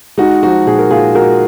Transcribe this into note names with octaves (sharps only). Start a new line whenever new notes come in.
G#3 D#4 F#4
F3 D#4 F#4
A#2 G#4
A#4
A#2 F4 G#4
G#3 F#4 A#4